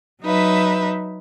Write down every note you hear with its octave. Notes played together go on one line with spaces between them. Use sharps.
F#3 D#4 B4 E5